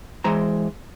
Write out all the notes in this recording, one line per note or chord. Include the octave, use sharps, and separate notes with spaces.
E3 G#3 C5 A#5